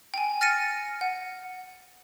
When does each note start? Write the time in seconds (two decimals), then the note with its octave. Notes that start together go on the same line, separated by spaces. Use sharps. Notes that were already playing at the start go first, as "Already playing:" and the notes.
0.14 G5 G#5
0.41 F6 A6 A#6 C#7 D#7
1.01 F#5